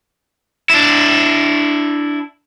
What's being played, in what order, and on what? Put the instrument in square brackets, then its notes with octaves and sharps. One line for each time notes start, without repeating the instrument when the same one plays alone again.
[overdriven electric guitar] D4 E4